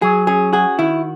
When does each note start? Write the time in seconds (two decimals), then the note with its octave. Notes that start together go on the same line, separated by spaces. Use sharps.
0.02 F#3 G#4
0.27 C#4 G#4
0.53 F#4 G#4
0.79 D#3 E4